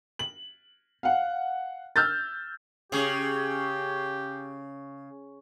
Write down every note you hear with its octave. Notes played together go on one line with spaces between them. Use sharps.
F#7
F5 F#5
E6 F6 G6 A6
C#3 C#4 G4 G#4